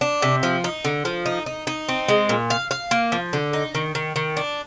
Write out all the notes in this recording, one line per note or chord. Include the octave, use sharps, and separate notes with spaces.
D4
C3
F3
D#4
D3
F3
D#4
D#4
D#4
C4
G#3
A#2
F5
F5
A#3
F3
D3
D#4
D#3
D#3
D#3
D4